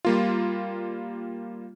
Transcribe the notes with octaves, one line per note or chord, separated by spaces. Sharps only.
G3 A#3 F4